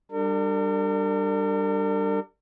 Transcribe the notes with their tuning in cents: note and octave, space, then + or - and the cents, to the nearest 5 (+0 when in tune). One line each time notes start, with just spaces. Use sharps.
G3 +0 D4 +15 A#4 -45